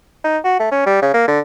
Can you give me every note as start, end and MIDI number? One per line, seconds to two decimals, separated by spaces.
0.24 0.38 63
0.44 0.55 66
0.60 0.70 57
0.72 0.82 61
0.86 0.98 55
1.02 1.14 49
1.14 1.24 58
1.28 1.40 50